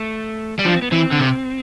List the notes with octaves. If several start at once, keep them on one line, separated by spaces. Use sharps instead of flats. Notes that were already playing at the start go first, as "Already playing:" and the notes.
Already playing: A3
G3
F3 D4
C4
B3
E3 C4
D3
C3